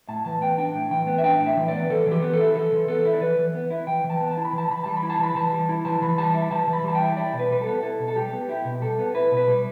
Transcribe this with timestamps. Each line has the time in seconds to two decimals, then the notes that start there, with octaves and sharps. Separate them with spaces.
0.08 A2 A5
0.25 E3 A5
0.42 B3 G5
0.58 D4 G5
0.75 A2
0.91 E3 G5
1.07 B3
1.18 E5
1.23 D4 G5
1.40 A2
1.46 E5
1.57 E3
1.68 D5
1.73 B3
1.89 E3 A4
2.06 E3 G4
2.22 B3
2.33 A4
2.39 E4
2.55 E3 A4
2.72 E3
2.88 B3 A4
3.05 E4
3.14 D5
3.21 E3 B4
3.39 E3
3.55 B3
3.70 E4
3.87 E3 G5
4.04 E3
4.10 A5
4.21 B3
4.31 A5
4.37 E4
4.45 B5
4.53 E3 A5
4.70 E3 B5
4.84 G3 A5
4.97 B5
5.03 E4
5.10 A5
5.19 E3 B5
5.35 E3 A5
5.53 G3
5.69 E4
5.85 E3 A5
6.02 E3 B5
6.18 G3 A5
6.34 E4
6.51 E3 A5
6.67 E3
6.73 B5
6.84 G3 A5
6.95 G5
7.00 E4
7.17 E4 D5
7.33 B2
7.39 B4
7.50 G3 B4
7.61 A4
7.66 B3
7.83 E4 A4
8.00 B2
8.08 A4
8.16 G3 G4
8.32 B3
8.49 E4 G4
8.65 B2
8.81 G3 A4
8.99 B3
9.15 E4 B4
9.31 B2
9.37 B4
9.48 G3